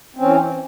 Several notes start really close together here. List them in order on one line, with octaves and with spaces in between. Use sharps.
C4 C#4 E3